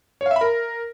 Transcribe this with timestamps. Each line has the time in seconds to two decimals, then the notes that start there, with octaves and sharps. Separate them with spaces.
0.21 C#5
0.26 F5
0.31 E5
0.36 B5
0.41 A#4